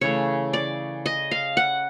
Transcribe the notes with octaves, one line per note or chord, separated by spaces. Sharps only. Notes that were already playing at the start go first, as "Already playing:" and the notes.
C#3 E3 A3 C#5
D5
D#5
F5
F#5